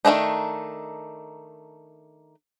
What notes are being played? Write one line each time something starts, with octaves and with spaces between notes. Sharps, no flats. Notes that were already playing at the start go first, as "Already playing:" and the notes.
D#3 F3 A3 D4 D#4